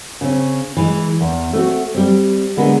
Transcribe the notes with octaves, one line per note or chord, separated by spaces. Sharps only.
C#3 C4
E3 G#3
E2
A3 C4 F4 F#4
G3 C4
D3 G#3 B3 A#4